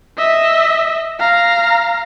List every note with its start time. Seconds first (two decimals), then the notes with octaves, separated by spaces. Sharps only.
0.17 D#5 E5
1.20 F5 A#5